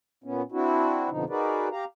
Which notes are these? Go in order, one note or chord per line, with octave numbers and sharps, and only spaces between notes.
A#2 B3 C#4
C4 D4 E4 F#4
F2 B2 D3 F3 D#4
D#4 F#4 G#4 A#4 B4 D5
G4 F5 A#5